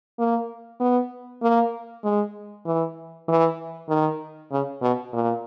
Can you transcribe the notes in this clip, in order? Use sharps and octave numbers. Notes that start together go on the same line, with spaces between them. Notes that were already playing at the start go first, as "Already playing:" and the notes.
A#3
B3
A#3
G#3
E3
E3
D#3
C#3
B2
A#2